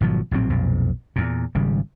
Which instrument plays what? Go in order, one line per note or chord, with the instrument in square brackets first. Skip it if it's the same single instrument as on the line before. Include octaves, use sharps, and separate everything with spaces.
[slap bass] G#1 B2 F3 F#3
A#1 A2 F#3 C4
B1 F2 A#2
E2 A#2
G#1 C#3 G3